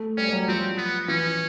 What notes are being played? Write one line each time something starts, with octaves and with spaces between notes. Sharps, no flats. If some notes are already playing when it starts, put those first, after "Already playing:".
Already playing: A3
G3 C#4
G3
F#3
F3 C4
B3
E3 C#4